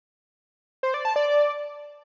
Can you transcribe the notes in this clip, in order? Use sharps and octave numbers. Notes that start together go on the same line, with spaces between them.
C5
D5
A5
D5